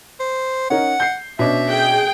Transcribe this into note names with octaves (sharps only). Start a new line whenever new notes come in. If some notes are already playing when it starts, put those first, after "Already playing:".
C5
C#4 D#4 A#4 F#5
G6 C7
B2 C#4 D4 E5
G#4 G5